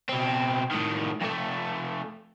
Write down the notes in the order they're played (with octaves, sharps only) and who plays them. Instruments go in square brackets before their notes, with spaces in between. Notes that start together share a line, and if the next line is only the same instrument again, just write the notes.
[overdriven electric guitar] B2 C4
A2 D#3
F2 A3